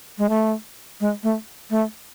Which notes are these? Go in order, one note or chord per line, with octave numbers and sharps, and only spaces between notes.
G#3
A3
G#3
A3
A3